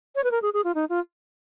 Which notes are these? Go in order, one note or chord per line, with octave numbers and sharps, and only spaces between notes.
C#5
B4
A#4
G#4
G#4
F4
D#4
F4